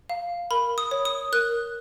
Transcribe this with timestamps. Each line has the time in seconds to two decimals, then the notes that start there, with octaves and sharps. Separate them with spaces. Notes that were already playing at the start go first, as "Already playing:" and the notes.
0.10 F5
0.51 A#4 B5
0.78 D#6
0.91 C#5
1.05 D#6
1.33 A#4 F#6